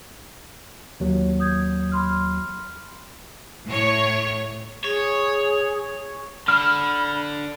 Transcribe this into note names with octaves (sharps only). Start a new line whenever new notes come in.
D#2 F#3
D#6 G6 G#6
B5 C6 F6
A2 C#5
G#4 C#5
D3 B5 F6